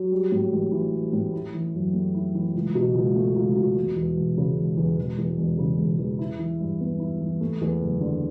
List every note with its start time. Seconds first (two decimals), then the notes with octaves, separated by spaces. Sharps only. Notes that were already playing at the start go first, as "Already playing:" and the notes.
Already playing: F#3
0.11 G3
0.32 A2
0.52 A1
0.72 E3
0.92 G3
1.13 A2
1.34 E4
1.54 E3
1.74 F#2
1.93 A3
2.14 E4
2.35 E3
2.54 C#2
2.75 B2
2.95 C#2
3.15 A3
3.36 C#2
3.56 B2
3.76 E1
3.96 E2
4.17 E1
4.37 C#3
4.57 E1
4.77 E2
4.97 E1
5.18 E2
5.38 E1
5.58 C#3
5.79 E1
5.99 E2
6.19 E4
6.39 E3
6.60 G2
6.80 B3
7.00 E4
7.21 E3
7.41 A3
7.61 E2
7.81 F#1
8.01 D3